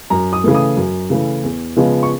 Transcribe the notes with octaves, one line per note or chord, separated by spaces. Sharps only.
F#2 A#5
D#6
C#3 E3 A3
D#6
F#2
C#3 E3 A3
E2
C#3 F3 G#3 B3
C#6